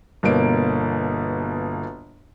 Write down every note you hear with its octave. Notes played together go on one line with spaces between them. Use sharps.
G1 B2 A#3 D7